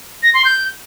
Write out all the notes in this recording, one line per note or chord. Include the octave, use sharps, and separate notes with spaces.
A#6
C6
G6